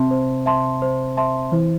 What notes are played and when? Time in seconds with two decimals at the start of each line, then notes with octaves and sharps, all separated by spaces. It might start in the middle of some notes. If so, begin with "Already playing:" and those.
Already playing: C3 C4 E5 A5 C6
0.11 C5
0.46 E5 A5 C6
0.82 C5
1.17 E5 A5 C6
1.52 E3 E4 C5